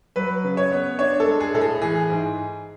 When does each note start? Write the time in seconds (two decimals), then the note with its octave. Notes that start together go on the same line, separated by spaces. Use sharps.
0.16 F#3 B4
0.44 C#3
0.57 C#5
0.72 B3
0.99 D4 C#5
1.20 A4
1.27 G#3
1.40 G#4
1.54 A2 A4
1.61 G#4
1.82 E3 G#4
2.10 G#2